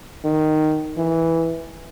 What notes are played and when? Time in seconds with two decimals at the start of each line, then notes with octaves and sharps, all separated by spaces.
0.24 D#3
0.97 E3